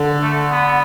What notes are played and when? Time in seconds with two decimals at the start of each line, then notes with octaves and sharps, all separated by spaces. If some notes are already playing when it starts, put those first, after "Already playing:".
Already playing: D3
0.22 A3
0.52 B3